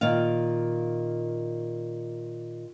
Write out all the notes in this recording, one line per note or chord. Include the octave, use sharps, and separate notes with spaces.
A#2 D#3 F5